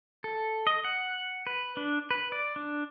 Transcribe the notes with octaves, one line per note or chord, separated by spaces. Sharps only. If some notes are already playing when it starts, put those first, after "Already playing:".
A4
D#5
F#5
B4
D4
B4
D5
D4